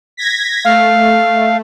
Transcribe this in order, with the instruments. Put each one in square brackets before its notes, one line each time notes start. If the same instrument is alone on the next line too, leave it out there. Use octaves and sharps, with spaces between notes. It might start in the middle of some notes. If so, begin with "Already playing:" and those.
[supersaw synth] G#6 A#6 B6
[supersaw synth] A3 [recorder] F5